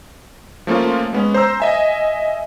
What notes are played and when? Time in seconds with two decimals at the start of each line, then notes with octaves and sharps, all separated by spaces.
0.67 F3 A3 A#3 C#4 F4
1.13 G#3 B3 C#4
1.34 C5 A#5 E6
1.60 D#5 E5 G#5